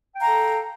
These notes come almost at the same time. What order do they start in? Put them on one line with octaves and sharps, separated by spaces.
G5 F5 A#5 A4